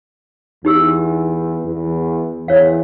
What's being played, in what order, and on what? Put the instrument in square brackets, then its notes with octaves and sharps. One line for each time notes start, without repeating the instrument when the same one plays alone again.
[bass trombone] E2 [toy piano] D#4 G4 E6
[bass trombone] E2
[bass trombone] E2 [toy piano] C#5 F5